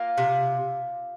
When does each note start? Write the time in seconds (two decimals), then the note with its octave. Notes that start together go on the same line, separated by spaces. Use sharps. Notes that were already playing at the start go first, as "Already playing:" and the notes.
Already playing: A#3 F4
0.18 C3